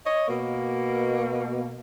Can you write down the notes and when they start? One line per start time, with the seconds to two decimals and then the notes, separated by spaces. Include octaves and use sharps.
0.06 C#5 D#5
0.28 B2 A#3